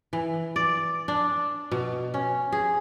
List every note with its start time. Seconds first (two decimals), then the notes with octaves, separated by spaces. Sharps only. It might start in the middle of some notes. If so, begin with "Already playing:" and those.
0.13 E3
0.56 D5
1.08 D4
1.72 B2
2.14 C#4
2.52 G#4